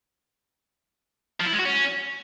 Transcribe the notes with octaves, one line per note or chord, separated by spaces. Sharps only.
F3
E4
G#3
F#4
C#4